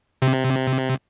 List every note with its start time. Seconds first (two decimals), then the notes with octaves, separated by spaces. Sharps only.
0.22 C3